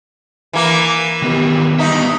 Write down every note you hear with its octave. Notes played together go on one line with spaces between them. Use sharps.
E3 A#3
D#3 B3 G4
G3 B3 D#4 E5